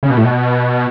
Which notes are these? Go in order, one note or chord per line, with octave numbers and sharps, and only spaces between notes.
C#3
B2
A2
B2